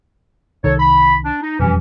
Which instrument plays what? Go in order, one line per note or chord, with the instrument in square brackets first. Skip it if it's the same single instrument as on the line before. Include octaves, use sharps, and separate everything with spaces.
[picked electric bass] C2 D#3 [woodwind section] A4 C#5
[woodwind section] B5
D4
D#4
[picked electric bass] E1 F2 G3 [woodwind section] E3 C#4